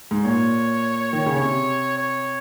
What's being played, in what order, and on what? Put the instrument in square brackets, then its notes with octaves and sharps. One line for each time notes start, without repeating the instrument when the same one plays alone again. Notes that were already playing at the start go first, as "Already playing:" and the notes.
[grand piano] G#2
[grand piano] A#2 [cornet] C#5
[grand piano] D#3
C#3
[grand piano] C3 [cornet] C#5
[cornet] C#5